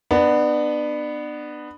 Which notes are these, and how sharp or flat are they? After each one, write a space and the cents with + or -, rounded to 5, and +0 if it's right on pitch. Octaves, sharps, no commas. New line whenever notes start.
B3 +0 D4 +30